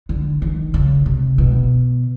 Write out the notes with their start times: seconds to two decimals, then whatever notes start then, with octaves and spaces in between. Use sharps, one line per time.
0.09 D3
0.42 D#3
0.74 C#3
1.06 C3
1.38 B2